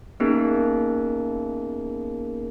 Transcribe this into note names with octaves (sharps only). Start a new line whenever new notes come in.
A#3 B3 C#4 D#4 G#4 A#4